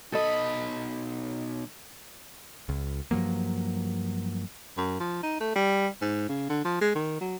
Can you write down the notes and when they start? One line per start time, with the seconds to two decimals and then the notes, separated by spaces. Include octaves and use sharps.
0.12 B1 A4 D#5 B5
2.69 C#2
3.11 G2 F3 F#3 A#3
4.77 F#2
5.00 F3
5.23 D#4
5.40 A3
5.56 G3
6.02 G#2
6.29 C#3
6.49 D3
6.64 F3
6.81 G#3
6.95 D#3
7.21 F#3